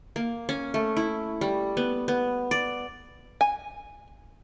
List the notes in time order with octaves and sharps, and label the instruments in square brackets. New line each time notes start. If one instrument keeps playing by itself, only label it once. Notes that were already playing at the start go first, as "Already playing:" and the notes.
[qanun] A#3
C#4
A3
E4
G3
B3
B3
D5
[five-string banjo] G#5